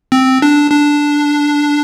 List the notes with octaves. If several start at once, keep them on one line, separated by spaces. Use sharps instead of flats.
C4
D4
D4